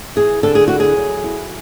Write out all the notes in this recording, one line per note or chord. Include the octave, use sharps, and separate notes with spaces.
E3 G#4
D3 A4
G#4
E4 F#4
G#4
F#3
E4